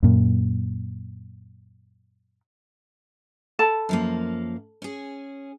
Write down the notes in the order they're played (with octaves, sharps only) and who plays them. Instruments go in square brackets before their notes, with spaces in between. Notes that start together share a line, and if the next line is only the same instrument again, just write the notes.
[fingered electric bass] F#2 A#2
[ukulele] A4 A5 B5
[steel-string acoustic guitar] F#2 F3 A#3
C#4 G#4